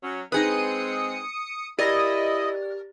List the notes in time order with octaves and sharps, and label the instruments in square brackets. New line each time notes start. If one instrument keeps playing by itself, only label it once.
[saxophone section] F#3 C#4
[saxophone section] G#3 C4 [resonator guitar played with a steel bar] D#4 G#4 B4 [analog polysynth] D#6 C#7
[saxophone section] E4 [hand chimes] G4 D5 A6 [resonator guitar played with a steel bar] A#4 [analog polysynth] D#5